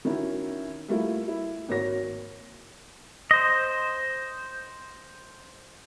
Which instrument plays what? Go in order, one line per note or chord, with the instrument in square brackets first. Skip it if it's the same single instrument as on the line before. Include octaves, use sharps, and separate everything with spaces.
[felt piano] D#3 C#4 E4 F#4
G3 A3 A#3 E4 F4
E4
G#1 A#3 F#4 C#5 A#6
[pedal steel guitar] C5 D#5